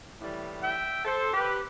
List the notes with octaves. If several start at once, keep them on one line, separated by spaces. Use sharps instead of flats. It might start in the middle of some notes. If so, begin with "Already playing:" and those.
A2 E3 G3
E5 G5
A4 C5
G4 B4